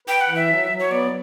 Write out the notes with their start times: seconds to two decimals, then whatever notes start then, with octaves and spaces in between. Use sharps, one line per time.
0.07 B4 G5
0.21 F#5
0.28 E3
0.35 E5
0.50 F#3
0.70 F#3
0.79 C#5
0.91 B3 D5